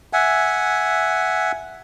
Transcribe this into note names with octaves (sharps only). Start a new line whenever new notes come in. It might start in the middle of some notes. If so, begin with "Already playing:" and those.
E5 F#5 G#5